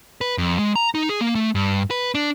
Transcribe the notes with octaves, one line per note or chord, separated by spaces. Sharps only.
B4
F2
G#3
A#5
D#4
G#4
A#3
A3
G2
B4
D4